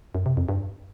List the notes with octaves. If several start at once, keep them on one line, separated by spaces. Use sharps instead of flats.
F#2
C3
F2
G2